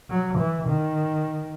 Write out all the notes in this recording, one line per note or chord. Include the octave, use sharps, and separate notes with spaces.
F#3
E3
D#3